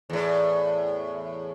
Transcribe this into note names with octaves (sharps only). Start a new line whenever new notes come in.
E2 A2